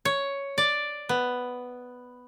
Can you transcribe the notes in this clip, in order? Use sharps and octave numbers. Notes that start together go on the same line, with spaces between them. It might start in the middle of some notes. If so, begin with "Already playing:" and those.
C#5
D5
B3